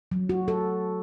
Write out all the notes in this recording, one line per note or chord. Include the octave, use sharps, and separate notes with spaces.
F#3
F#4
A4